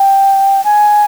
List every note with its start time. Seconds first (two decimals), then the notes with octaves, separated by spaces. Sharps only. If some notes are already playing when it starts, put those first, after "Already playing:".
Already playing: G5
0.64 G#5